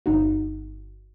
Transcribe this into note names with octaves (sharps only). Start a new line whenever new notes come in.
G1 D#4 F#4